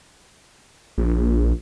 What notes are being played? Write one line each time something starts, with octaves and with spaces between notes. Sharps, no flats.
A#1